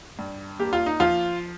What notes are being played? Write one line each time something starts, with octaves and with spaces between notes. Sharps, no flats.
G2
A#3 G4
F4
D#4
F3 F4